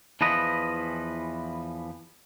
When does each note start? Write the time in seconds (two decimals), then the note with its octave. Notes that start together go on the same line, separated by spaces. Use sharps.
0.21 E2 E3 F3 B4 D#5